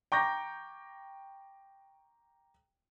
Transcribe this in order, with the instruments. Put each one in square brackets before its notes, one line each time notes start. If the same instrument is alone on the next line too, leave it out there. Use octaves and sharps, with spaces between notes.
[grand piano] G5 A#5 C#6 D6 G6 A#6